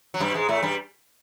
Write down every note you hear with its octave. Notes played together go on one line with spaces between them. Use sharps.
F#3
G2 G3
G#2 G#3
A2 A3
G2 G3